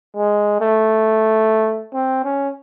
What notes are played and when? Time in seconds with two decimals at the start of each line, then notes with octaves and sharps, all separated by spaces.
0.17 G#3
0.61 A3
1.94 C4
2.24 C#4